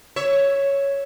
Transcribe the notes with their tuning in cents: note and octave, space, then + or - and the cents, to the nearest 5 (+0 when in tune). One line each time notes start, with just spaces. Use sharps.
C#5 +0 E5 +0